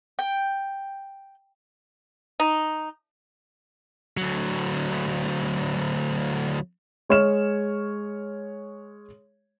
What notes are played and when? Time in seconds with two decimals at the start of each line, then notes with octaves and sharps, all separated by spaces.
0.19 G5
2.40 D#4
4.17 D2 F#3
7.09 G#3 C#5 F6 E7